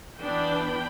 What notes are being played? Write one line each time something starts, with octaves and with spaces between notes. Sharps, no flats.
E3 B3 D4 G5 B5